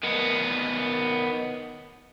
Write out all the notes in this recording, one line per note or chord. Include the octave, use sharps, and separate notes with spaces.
D#3 B3